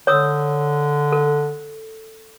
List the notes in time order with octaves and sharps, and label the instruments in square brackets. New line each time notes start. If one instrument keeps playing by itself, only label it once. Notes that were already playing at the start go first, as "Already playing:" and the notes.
[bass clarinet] D3 [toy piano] C#5 D#6 E6
[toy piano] A4